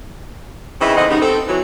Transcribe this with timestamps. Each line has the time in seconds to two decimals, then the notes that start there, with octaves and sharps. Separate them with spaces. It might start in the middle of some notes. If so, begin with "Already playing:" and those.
0.81 G#2 C#3 E3 C4 D#5 E5
0.97 E2 D3 C4 D#4 D#5 F#5
1.10 C#3 G3 B3 D#4
1.22 C4 A4
1.48 E3 F#3